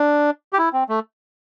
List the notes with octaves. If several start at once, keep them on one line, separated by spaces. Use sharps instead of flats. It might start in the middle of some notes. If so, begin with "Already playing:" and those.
Already playing: D4
G4
E4
C4
A3